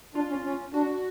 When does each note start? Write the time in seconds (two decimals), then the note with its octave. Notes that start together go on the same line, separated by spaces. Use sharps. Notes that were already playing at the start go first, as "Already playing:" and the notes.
0.15 D4 F4
0.29 C#4
0.44 C#4
0.73 D4 F#4